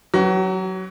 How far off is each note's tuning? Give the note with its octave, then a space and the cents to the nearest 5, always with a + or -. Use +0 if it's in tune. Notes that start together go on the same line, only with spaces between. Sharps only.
F#3 +5 F#4 +40 B4 +10